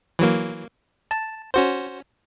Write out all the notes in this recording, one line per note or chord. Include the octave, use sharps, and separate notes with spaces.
E3 F#3 A#3
A5
C#4 F#4 C5